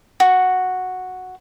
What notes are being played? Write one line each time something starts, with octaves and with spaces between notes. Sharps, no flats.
F#4